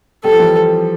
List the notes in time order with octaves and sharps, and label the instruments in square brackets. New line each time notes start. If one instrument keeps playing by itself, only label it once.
[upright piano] G3 [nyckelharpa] A4
[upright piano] F3
E3 G3